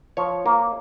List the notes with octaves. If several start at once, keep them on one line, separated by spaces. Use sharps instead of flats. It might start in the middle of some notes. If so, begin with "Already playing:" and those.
F3 C#5
A#3